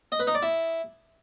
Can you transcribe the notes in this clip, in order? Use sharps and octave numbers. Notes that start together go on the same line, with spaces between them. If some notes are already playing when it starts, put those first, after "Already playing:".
D#5
B4
D#4
D5
E4